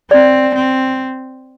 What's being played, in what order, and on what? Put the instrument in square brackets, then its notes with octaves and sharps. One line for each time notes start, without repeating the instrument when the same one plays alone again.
[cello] C4 [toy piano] D5
[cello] C4